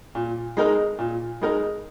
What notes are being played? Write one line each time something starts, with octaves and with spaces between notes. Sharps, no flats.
A#2
G#3 D#4 A#4
A#2
G#3 D#4 A#4